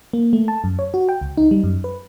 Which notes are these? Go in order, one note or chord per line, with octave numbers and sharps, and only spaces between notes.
A#3
A3
A5
F#2
C#5
F#4
G5
C#2
D#4
G3
F#2
B4